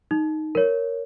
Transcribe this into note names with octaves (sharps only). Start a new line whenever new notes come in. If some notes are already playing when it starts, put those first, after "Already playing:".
D#4
A#4 C#5